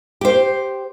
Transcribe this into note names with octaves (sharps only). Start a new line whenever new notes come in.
G4 C5